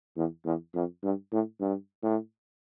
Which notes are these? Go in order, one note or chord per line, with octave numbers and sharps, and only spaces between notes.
E2
E2
F2
G2
A2
G2
A2